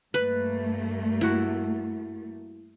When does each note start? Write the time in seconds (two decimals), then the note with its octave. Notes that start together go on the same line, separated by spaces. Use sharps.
0.14 G2 A3 A#3 B4
1.21 E4 F#4